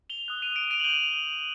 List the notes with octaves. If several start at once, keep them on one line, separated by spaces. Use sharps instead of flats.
F7 G7
D#6 F#6
D#7 F7
D7 E7
D#7 F7
F#7
D6 G6 F7 G7